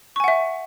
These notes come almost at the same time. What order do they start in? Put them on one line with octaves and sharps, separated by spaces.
C#6 G#5 F#5 E5